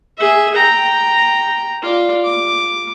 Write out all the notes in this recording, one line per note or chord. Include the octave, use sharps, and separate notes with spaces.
G#4 E5
G5 A#5
F4 D5
D6